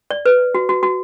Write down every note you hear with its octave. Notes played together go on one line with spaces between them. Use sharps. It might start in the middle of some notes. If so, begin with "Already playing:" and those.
D5
B4
F#4
F#4
F#4